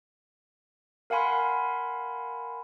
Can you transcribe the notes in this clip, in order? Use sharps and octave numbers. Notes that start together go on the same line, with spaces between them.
A#4 F5 F#5 G#5 B5 C6